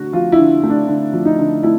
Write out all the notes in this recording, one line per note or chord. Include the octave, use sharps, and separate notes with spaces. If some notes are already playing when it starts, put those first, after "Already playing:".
Already playing: D3 A3 F#4
F3 F4
E4
D3
A3
D4
D3
F3
D#4
D3
A3 E4